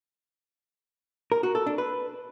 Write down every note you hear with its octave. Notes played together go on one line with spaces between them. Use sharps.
A#4
F#4
A4
D4
B4